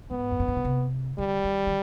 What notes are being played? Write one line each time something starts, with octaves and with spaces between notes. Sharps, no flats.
G#2 B3
F2
G2
G#2
B2
C3
D3 G3
D#3
D#3